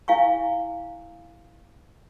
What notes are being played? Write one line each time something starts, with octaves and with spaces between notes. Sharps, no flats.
E4 F5 G#5 C#6